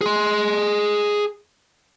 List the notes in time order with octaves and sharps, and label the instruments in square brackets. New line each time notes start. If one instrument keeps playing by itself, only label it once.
[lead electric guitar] G#4 C6